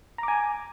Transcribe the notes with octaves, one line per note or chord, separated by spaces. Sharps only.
G#5 A#5 D6